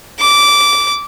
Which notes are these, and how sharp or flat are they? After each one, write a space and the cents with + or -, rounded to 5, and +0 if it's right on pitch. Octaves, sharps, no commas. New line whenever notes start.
D6 -15